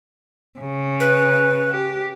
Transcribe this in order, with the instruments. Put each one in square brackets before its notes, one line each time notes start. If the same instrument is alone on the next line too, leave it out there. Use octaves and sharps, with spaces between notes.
[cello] C#3
[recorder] B4
[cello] G4